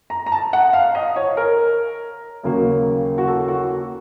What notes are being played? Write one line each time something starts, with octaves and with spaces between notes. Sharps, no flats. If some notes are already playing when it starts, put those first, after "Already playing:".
A#5
A#5
A5
F#5
F5
D#5
C#5
A#4
D#2 C#3 F#3 A#3
F#4
A4
F#4